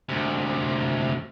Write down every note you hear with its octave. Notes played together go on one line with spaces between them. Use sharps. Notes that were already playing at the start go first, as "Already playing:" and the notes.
D2 C3